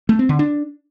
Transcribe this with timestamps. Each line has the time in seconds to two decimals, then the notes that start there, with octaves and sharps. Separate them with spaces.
0.09 A3
0.19 C4
0.29 D3
0.39 D4